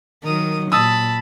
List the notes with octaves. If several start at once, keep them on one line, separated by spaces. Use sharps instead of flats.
D#3 F#3 A#4 D#6
A#2 A5 B5 D#6 E6